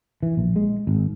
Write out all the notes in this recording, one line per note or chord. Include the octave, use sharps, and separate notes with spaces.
E3
A#1
G#3
G#1